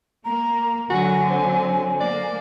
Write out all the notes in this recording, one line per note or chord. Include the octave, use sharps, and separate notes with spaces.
A#3 A#5
D3 F#3 F#4 G#5
C4
A#3 D5